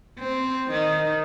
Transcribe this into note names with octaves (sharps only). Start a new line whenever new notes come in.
C4
D#3